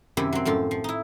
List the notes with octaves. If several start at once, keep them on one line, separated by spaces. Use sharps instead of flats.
F#2 C3 D#3 E4 G4 B5
F#3 C4
F#2 A2 F3 F4
F3
D#4 E4